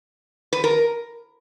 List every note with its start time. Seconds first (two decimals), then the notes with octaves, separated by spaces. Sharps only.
0.53 B4
0.64 A#4